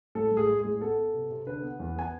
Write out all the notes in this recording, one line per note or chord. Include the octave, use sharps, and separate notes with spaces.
A2 A4
A2
G#4
G#3
A2 G#4
B3 A4
B3
C3
C3
D3 B4
B3
E2
B3 G#5